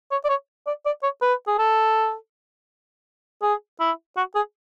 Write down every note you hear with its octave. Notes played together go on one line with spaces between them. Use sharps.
C#5
D5
C#5
D5
D5
C#5
B4
G#4
A4
G#4
E4
F#4
G#4